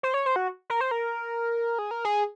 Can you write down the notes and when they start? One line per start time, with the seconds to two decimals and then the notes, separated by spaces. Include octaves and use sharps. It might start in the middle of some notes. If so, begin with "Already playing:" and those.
0.03 C5
0.14 C#5
0.26 C5
0.36 F#4
0.70 A#4
0.81 C5
0.91 A#4
1.79 G#4
1.91 A#4
2.04 G#4